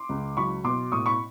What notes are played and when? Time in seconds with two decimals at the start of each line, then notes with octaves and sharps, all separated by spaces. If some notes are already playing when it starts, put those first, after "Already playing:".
Already playing: C6 D6
0.09 C#2
0.37 F#3 B5 C#6
0.64 B2 C6 D6
0.92 A2 C#6 D#6
1.06 B5 C#6